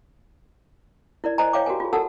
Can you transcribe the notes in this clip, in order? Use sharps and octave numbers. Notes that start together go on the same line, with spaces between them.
E4 A#4 D5
C5 D#5 G#5 A#5
C#5 F5 G5 D6
F#4 G4 A#4 G#5
F4 G#4
F#4 A4 A#4 F#5 A5 E6